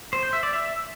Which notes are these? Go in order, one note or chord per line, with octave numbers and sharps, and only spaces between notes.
C5
C5
E5
D5
E5